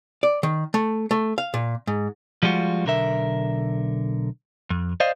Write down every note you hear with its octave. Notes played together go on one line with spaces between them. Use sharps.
D5
D#3
A3
A3
F5
A#2
G#2
F3 G3 G#3 F4 F#4
B1 D3 A#4 E5
F2
C5 D5 D#5 F5